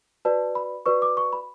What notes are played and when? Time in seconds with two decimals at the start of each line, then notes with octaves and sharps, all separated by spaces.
0.25 F#4 B4 D5 A5
0.55 B5
0.86 F#4 B4 D5 C#6
1.02 D6
1.17 C#6
1.33 B5